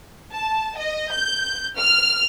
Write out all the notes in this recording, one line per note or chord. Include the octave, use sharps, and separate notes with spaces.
A5
D#5
G6
F6